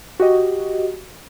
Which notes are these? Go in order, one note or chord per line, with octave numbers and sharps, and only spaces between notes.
F#4 G4 D#5